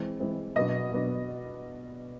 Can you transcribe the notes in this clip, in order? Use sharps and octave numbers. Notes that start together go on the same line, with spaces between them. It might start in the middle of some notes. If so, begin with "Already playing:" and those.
Already playing: E3 G#3 C4
E3 G#3 C4
B2 F#3 B3 D4 D#5
B2 F#3 B3 D4